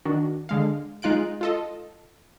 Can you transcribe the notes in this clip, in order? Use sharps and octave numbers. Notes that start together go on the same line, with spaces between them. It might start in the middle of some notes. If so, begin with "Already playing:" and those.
D#3 D4 F#4
D3 G#3 F5
G#3 D#4 F4 F#6 D7
F4 A4 D#5